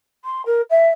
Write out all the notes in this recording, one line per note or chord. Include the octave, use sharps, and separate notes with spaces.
C6
A#4
E5